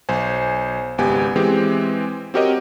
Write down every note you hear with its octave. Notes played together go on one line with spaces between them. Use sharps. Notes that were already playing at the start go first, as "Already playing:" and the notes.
B1 C5 G#5
G#1 C#2 B3 G4 G#5
E3 G#3 C4 G4
C4 F#4 G4 A#4 C#5 D#5